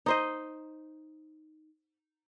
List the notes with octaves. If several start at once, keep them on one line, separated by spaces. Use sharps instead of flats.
D#4 C5 D#5